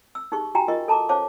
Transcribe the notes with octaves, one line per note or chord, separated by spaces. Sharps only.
E6
D#4 G4 G#4 C#6
F#4 G4 G5 G#5 A#5
F4 A#4 D#5 C#6
A4 A5 A#5 D6
C#4 C5 C#5 F5 A5 D6